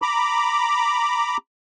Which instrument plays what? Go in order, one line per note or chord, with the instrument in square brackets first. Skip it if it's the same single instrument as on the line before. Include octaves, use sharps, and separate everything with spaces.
[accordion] A#5 B5 D6